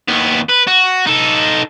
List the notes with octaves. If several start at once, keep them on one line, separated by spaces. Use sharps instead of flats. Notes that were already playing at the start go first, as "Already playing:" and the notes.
D#2 B3
B4
F#4
D#4 A4